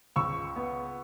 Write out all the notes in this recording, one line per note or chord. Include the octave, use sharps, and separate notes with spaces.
C#2 C#6 E6
B3